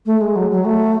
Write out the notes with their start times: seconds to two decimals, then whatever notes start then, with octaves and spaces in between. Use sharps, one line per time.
0.06 A3
0.20 G#3
0.35 F#3
0.50 F#3
0.64 A3